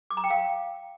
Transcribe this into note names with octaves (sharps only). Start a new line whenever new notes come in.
D6
A#5
G5
F5